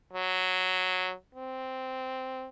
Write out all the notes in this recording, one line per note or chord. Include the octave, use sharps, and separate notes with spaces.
F#3
C4